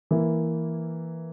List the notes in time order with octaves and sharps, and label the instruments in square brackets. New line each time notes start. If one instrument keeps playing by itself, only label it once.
[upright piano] E3 A#3 E4